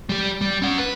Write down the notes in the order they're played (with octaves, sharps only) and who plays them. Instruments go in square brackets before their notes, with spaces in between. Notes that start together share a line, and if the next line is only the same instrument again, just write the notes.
[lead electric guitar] G3 G4
G3
C#4 F#5
B4